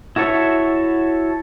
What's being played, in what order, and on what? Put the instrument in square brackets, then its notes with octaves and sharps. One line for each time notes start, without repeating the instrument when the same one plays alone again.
[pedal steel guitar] E4 F#4 A4 C#5 E5